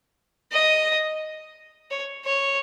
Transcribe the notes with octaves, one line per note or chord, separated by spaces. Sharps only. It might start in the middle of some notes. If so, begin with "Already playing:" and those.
D#5
C#5
C#5